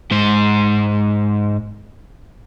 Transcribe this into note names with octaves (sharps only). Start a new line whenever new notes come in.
G#2 C5